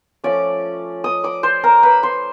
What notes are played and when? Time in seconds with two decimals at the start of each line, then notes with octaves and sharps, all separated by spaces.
0.24 F3 A3 C#4 D5 D6
1.04 D#5 D#6
1.24 D5 D6
1.43 C5 C6
1.64 A#4 A#5
1.83 B4 B5
2.03 C5 C6